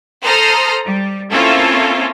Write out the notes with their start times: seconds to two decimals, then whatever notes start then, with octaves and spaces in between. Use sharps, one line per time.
0.24 A4 C5 A#5 C6 D#6 F6
0.85 G3
1.31 A#3 C4 C#4 E4 F4 A4